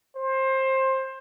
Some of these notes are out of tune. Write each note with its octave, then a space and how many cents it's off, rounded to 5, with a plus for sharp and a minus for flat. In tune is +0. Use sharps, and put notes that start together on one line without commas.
C5 +20